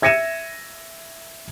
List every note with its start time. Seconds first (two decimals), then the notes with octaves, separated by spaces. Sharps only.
0.02 E5 G#6 A#6 C#7 D#7 E7